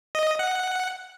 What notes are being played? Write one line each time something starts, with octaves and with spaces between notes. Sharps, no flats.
D#5
F#5